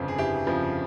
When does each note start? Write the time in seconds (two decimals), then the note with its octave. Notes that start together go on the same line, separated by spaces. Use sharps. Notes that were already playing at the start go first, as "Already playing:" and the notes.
Already playing: G1 F2 C#3 F3
0.08 G#4
0.18 G1 E4 G4
0.47 F2 C#3 F3